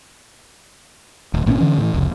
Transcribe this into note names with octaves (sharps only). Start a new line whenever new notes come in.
D1
G#1 A#2 C4 C#4
D3 E3 C#4
A2 E3
F1 C#2